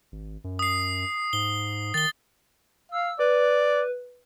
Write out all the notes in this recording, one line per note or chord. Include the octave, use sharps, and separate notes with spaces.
G#1
F#2
D#6 C7
G#2 G7
D#3 A6 G7
F5 E6
B4 D5